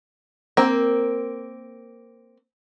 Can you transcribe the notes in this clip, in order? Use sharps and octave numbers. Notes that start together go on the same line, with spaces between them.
A#3 C4